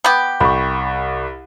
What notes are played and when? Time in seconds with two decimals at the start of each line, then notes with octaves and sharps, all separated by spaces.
0.04 B3 G4
0.40 C2 B5 C#6